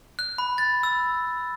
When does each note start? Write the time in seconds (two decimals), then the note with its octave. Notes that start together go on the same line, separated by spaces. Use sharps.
0.19 F#6
0.38 B5
0.58 A6
0.83 E6